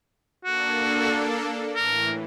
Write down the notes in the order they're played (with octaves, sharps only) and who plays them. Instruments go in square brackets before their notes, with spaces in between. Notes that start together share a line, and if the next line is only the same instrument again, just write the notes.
[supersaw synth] A#3 D4 A4 [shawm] F#4
[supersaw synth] A2 E3 [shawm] A#4